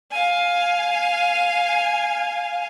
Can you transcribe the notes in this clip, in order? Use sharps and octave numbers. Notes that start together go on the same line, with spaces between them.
F5 G#5